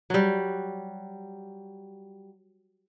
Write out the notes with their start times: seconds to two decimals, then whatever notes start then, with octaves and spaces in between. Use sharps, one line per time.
0.10 F#3 G3